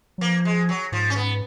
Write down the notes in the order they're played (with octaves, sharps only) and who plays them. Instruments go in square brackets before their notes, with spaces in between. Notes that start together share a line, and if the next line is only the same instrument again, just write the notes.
[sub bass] F#3
[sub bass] F3 [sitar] A#3
[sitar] G#3
F#3
[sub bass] G#2 [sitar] F3
[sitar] C#4
B3